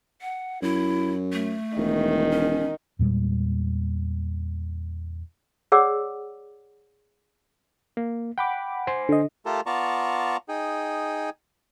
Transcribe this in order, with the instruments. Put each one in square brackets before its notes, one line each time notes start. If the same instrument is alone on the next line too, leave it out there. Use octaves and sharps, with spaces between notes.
[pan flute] F#5
[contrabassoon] F#2 [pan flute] E4
[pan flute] A3
[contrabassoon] E1 [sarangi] D#3
[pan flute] C#4
[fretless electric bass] E2 A#2 G3 G#3
[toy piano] G#4 C#5 D5 F#5 D6 E6
[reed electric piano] A#3
[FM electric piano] F#5 B5 D6 [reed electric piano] G5
[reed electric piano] C5 G#5 C6
[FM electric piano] D3 D#5
[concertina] A3 F4 G4 A4 A#4
B3 F4 D5 A5 A#5 C#6
D#4 G#4 G5